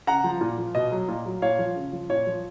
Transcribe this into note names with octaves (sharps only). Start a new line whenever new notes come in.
C#3 F#5 A#5
F3
A#2
F3
B2 D#5
F#3
A#2
F#3
A#2 C#5 F5
F3
C#3
F3
A#2 C#5
F3